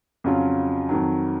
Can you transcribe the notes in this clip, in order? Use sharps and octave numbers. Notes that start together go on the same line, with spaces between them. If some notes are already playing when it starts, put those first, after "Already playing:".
F2 C#3 F#3 C#4 F4
F2 D#3 F#3